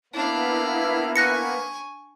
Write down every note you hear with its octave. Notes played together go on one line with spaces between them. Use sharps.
A#3 B3 D4 E4 F5
G#5 C#6 F#6 A#6 C#7